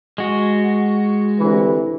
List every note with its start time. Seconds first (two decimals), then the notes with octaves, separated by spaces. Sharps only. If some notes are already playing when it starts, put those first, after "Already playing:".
0.18 G#3 F#4
1.39 D2 C3 E3